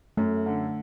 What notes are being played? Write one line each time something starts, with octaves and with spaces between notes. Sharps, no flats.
F#2 A3
D3